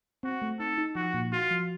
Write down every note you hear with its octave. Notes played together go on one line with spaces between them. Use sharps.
C4 F#4
A3
D#4 A4
D#4
F3 F#4
A#2
F4 F#4
F3